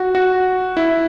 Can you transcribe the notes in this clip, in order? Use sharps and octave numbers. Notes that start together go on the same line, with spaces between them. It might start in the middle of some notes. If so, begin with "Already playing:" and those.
Already playing: F#4
F#4
E4